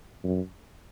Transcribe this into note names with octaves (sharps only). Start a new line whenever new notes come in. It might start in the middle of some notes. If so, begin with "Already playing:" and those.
F#2